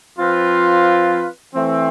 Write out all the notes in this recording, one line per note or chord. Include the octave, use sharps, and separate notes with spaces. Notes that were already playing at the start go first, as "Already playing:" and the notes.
F3 C4 F4 B4
E3 A3 C4